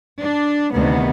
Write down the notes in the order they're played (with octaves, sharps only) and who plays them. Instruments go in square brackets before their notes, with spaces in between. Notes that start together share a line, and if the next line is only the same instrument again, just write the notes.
[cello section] D4
D2 C3 D#3 B3